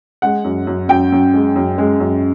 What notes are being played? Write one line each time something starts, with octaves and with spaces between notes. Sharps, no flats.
G#3 F#5
F#2
F#2
F#2 G5
F#2
G#3
F#2
G#3
F#2